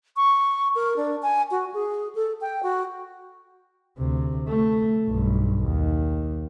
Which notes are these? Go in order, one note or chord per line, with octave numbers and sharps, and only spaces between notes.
C#6
A#4
D4
G#5
F#4
G#4
A4
G5
F#4
D2 C3
A3
B1 G2
D#2